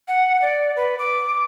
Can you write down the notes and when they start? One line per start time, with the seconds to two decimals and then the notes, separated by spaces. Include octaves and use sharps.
0.08 F#5
0.42 D5
0.76 B4
0.99 D6